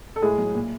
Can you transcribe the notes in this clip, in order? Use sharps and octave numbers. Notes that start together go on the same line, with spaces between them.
A4
A2 G#3 G#4
F#3
A#2